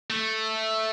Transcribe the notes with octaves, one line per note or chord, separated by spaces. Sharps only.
A3